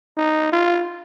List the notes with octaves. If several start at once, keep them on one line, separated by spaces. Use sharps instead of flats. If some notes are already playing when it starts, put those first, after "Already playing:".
D#4
F4